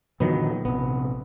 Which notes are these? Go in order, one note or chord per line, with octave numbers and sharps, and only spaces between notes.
A#2 D3 D#3 F3 F#3 B3
A#1 C3 B3